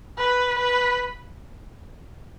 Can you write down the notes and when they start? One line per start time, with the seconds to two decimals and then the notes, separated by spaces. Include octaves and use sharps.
0.18 B4
0.58 B4